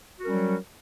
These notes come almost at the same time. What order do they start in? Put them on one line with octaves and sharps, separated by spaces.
F#4 A#4 C#4 G3 F#3